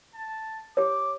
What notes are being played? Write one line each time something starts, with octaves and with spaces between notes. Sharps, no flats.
A5
G4 C#5 D6